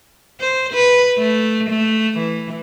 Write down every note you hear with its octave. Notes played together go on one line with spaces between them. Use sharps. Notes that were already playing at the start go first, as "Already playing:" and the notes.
C5
B4
A3
A3
E3